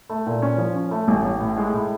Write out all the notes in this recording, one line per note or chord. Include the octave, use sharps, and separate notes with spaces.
A3
A#2
C#4
F3
C#4
A3
A1
A1
A2
G#3
A2